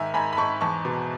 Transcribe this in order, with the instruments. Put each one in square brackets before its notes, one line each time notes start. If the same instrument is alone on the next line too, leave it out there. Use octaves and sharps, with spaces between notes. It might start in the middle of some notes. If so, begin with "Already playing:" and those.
Already playing: [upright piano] G#2 D#3 E5 G#5
G#2 G#5 B5
B5
G#2 A5 C#6
E2 A5 C#6
B2